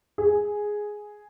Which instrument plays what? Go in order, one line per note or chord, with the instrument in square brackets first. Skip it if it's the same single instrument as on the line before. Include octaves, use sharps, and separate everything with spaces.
[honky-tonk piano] G#4